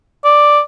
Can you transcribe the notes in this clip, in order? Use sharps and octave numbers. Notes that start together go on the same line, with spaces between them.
D5